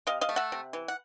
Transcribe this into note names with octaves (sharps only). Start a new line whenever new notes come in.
C3 D#5 F5
D#5 F5
A3
E5 F#5
C3
E3
F#5